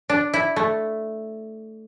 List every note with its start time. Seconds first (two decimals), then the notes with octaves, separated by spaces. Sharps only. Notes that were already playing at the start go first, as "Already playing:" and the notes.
0.10 D4
0.34 E4
0.56 A3